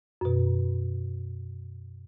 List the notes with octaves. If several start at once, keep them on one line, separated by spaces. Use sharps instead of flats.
F#2 B2